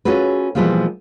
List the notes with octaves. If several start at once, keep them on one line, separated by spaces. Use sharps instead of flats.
C#4 F4 F#4 G#4 A4 B4
B2 E3 F3 G3 G#3 A#3